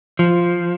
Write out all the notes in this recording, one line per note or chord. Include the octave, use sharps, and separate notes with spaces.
F3